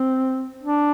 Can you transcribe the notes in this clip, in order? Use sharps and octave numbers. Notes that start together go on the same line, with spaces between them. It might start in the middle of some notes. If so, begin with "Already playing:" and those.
Already playing: C4
D4